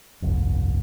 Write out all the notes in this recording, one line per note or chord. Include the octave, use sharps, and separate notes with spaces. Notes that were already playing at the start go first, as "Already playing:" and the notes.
G1 C2 F2